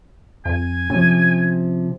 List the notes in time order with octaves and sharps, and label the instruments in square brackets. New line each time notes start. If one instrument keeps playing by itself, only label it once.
[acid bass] F2 [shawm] G#5
[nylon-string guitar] C3 F3 [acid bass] C#4